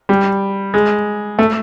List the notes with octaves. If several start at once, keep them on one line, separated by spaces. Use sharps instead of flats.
G3
G#3
A3